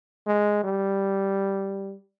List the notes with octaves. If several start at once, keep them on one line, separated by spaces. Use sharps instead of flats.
G#3
G3